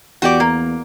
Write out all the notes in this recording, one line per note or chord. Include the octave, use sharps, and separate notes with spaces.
E2 F#4 G4 D5
A#3